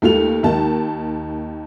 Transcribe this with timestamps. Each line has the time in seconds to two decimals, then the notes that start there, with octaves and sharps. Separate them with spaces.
0.02 D#2 A3 F4 F7
0.43 D#2 D#3 A5